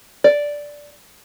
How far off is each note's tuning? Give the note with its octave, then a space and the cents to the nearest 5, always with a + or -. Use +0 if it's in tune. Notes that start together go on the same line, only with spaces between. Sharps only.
D5 -5